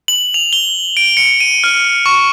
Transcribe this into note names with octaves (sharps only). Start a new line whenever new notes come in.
F#7
F7
G7
D7
C#7
D#7
F6
C#6